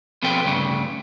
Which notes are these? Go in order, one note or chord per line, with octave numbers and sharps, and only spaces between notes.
B2 F3 C4 A4 B4 G5
D2 G2 C#3